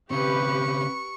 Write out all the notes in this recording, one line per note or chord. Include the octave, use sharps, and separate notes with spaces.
C#3 C4 G4 B4 C#6